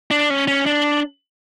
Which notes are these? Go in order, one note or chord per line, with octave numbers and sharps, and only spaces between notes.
D4
C#4
C#4
D4